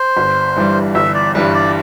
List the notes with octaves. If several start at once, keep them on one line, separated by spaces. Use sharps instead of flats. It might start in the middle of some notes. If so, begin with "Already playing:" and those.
Already playing: C5
G1
G2 E3 G3
G1 E5
D5
G2 E3 G3 B4
D5